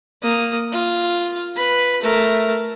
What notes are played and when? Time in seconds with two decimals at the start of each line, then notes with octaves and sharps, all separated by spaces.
0.22 A#3 D#6
0.72 F4
1.56 B4 B5
2.02 A3 A#4